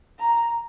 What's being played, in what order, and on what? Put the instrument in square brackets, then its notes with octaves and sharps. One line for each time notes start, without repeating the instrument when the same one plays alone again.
[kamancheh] A#5